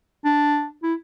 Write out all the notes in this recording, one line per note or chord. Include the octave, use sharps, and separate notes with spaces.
D4
E4